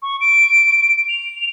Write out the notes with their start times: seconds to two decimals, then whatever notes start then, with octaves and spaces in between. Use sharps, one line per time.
0.02 C#6
0.21 D7
1.09 F7